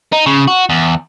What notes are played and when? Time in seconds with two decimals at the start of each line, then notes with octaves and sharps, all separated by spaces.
0.13 D#4
0.26 C#3
0.47 F#4
0.70 E2